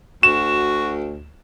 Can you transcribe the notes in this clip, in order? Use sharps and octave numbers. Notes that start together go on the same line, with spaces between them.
D2 F#4 E7